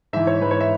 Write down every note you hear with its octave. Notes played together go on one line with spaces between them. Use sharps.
G#2 E3 E5
C#5
G#2 E3 B4
C#5
E5